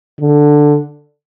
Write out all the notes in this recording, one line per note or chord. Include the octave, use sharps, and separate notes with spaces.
D3